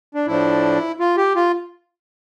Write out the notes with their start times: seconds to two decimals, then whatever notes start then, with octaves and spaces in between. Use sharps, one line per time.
0.14 D4
0.27 A2 F3 A3 D4 E4
1.00 F4
1.17 G4
1.36 F4